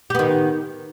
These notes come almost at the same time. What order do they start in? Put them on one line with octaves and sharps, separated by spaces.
G4 B3 D#3